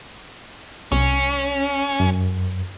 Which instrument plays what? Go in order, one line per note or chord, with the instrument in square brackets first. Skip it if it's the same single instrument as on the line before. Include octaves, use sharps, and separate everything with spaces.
[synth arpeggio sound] C2 [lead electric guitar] C#4
[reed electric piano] F#2